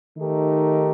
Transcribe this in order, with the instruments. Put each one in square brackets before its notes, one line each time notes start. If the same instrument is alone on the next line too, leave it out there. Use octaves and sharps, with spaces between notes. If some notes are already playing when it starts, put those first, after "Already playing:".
[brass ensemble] D#3 A3 D#4 G4 A#4